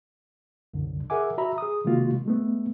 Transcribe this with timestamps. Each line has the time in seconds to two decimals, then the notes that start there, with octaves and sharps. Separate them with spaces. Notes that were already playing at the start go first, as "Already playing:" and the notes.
0.74 C2 F#2 D3
1.10 G#4 A#4 E5 F#5 G#5 D6
1.38 F#4 E5 A#5 B5
1.58 G#4 D#6
1.85 C3 D#3 G#3 A#3 F4 F#4
2.26 G#3 A3 B3